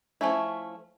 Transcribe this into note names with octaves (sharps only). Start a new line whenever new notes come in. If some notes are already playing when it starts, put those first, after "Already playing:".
F3 G3 A3 C#4 E4